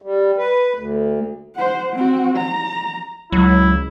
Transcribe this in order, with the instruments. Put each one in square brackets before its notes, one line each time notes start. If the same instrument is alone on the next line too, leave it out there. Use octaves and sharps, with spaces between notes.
[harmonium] G3
B4
D2
[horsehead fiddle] C5 F#5
C4 F#4
A#5
[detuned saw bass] C#2 [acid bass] F#3 [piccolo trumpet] E4